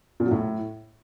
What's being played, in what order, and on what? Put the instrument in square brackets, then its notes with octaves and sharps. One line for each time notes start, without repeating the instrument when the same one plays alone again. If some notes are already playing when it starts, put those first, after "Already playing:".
[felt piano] A#2
F#3
A2